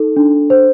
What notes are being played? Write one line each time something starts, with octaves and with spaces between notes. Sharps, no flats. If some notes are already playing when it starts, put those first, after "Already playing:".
Already playing: D#4 A4
D4
C5